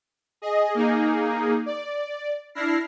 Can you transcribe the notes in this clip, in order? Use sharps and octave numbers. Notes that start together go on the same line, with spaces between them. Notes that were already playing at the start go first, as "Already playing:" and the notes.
G#4 D#5
A#3 D#4 G#4
D5
D4 E4 F6 A#6 C7